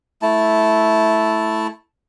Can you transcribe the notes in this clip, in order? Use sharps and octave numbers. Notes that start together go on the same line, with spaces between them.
A3 E4 A5